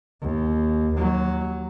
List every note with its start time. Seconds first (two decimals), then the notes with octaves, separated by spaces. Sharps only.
0.22 D#2
0.96 D#2 F#3